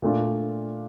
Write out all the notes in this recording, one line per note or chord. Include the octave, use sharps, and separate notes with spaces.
A#2 A3 D4 F4